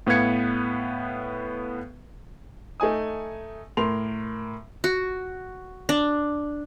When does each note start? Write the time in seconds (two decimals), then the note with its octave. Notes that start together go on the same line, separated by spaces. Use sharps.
0.07 A2 B3 B4 F5 G#6 C#7
2.80 A3 D#4 G#5 D#6
3.77 A2 A#4 C6 F7
4.84 F#4
5.89 D4